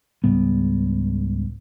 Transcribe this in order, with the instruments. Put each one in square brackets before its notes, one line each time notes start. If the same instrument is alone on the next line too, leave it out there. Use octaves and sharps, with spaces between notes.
[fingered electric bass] C#2 G#2 G3 B3